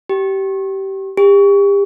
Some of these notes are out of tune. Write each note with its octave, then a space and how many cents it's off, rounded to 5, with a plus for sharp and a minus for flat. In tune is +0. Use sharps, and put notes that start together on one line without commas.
G4 -20
G4 +35